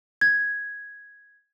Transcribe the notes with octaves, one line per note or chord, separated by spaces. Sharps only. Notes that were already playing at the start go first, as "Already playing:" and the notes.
G#6